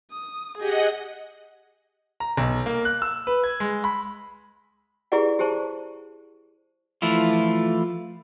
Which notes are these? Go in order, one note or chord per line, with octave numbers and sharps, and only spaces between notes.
D#6
G4 G#4 D#5 F#5
A#5
B1
A#3
F#6
E6
B4
G#6
G#3
B5
E4 G4 G#4 B4 D5 F#5
G4 G#4 C5 A5 C#6
E3 F3 A3 E4 F4